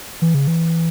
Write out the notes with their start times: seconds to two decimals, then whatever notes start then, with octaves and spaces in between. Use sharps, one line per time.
0.22 E3
0.34 C#3
0.47 E3